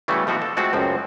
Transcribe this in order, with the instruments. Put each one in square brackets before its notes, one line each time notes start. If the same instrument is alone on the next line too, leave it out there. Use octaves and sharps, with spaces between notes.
[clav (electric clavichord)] C#3 E3 G3 A3 F#4
B2 F3 C4 F#4
A4
F3 G#3 A3 C4 F#4
C#2 F#2 F3 C4